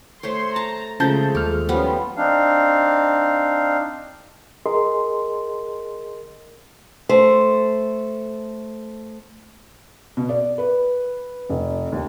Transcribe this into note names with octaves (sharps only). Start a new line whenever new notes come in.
A3 C5 C#5 C6
A5 A#5
C#3 F3 G#3 A3 A5 G6
D#2 A4 F6
F3 G3 B3 C#4
C4 D4 D#4 F5
G#4 A#4 D#5 C6
A3 C5
B2
D5
B4
F1
D#2